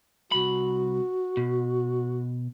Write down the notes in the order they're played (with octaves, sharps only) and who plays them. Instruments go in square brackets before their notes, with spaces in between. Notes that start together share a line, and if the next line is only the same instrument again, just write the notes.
[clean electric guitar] C2 B5 [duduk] F#4
[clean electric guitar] B2